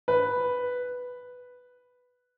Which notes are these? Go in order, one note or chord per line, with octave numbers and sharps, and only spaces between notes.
B4